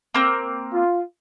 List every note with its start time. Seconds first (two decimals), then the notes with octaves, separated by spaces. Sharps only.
0.14 A#3 C4
0.72 F4